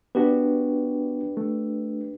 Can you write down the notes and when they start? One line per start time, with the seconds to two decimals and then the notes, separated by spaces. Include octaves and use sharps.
0.15 B3 D4 F#4 G4 B4
1.37 A3